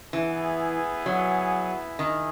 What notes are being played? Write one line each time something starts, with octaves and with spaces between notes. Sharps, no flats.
E3 B3 E4 G#4
F#3
D#3 E4 G#4